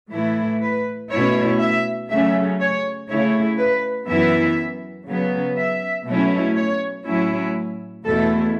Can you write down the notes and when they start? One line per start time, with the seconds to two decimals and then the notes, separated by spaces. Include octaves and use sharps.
0.11 A2 E3 A3 E4
0.62 B4
1.10 B2 A3 C#4 E4 C#5
1.60 E5
2.10 C#3 F#3 A3 C#4 E5
2.60 C#5
3.09 C#3 A3 E4 C#5
3.58 B4
4.08 F#2 E3 B3 E4 E5
5.08 C#3 F#3 B3
5.57 E5
6.06 B2 F#3 A3 C#4 E4
6.56 C#5
7.05 A2 F#3 C#4 E4
8.05 E2 B2 A3 E4 A4